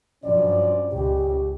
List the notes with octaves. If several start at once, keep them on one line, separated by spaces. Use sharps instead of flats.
G2 F3 F#3 C#4 D5
C#2 G4